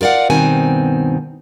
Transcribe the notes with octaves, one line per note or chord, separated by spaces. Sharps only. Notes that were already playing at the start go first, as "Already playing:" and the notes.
F4 A#4 D5 F5 F#5
G2 B2 D#3 C4 G#5